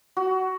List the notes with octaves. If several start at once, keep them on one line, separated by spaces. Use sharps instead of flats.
F#4